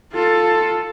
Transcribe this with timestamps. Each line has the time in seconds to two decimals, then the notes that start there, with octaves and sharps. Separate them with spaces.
0.13 F4 A4